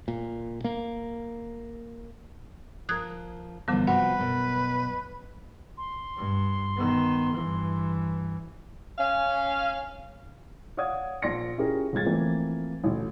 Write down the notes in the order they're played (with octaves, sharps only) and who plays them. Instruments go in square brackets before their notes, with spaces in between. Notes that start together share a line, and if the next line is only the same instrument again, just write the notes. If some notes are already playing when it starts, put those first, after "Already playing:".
[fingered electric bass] A#2
A#3
[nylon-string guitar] F3 A#4 [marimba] D#6 F#6 G#6
[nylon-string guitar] F#2 E3 F3 [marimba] D3 G3 B3
[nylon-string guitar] C3 F3 F#4 [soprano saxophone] B4 [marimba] F#5
[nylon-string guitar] F#2 B2
[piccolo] C6
[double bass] G2
D#3 B3
G2 E3
[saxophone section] C#4 F5
[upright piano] C#5 D5 F5 F#5 D#6 G#6
A#1 A#2 D5 C6 A#6 C#7
C#4 E4 F4 G4 G#4 A#4
G1 G#3 F4 G#6 A6
E3 F3 A3 A#3 C4
A1 D2